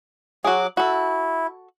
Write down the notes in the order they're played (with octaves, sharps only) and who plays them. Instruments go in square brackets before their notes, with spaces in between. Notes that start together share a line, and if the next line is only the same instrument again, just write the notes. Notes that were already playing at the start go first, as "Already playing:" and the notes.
[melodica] F#3 D6 [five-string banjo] F#4 G#4
[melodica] E4 [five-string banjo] F#4 A4